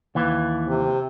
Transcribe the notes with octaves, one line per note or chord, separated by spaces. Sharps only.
D#2 E3
C3